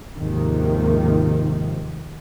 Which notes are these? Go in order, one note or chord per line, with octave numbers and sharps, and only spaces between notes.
D#2 G#2 C3 D#3 F3